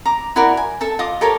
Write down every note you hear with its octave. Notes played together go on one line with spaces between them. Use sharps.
A#5 D6
E4 F#4 A#4 D5
G#5
A4 E5 A5
F4 D#5 D6 D#6
G4 A4 A#4 C#5